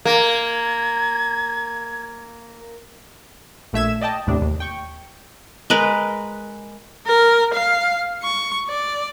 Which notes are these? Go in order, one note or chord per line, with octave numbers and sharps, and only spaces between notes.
A#3 G#6
A#1 A3 E5 G#6 E7
D5 D#5 G5 A5
D#2 A2 C3 D4
D#2
G5 C#6
G#3 A#4 B4
A#4
F5
C#6
D5